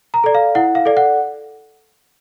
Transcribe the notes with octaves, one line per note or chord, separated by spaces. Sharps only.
A#5
A4 D5
F5
E4 F#5
F5
A4 D5
F#5